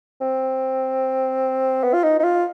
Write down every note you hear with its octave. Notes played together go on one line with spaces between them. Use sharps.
C4
B3
F4
D#4
D#4
F4